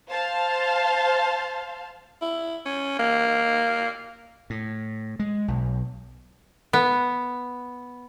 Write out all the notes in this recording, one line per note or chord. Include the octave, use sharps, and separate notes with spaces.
C5 F5 A5
E4
C#4
A#3
A2
G#3
B1
B3